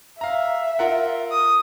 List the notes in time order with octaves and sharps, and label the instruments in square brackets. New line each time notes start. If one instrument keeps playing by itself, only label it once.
[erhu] E5 [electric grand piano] F5 A#5
[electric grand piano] F4 A#4 F#5
[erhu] D#6